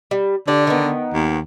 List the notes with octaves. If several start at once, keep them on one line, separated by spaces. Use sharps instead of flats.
G3
D3 G4 D5
D#3 B3
D#2